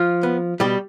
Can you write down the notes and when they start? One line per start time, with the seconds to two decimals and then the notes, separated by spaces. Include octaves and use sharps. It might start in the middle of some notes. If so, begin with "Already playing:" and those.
Already playing: F3 F4
0.23 B3
0.60 B2 G3 G4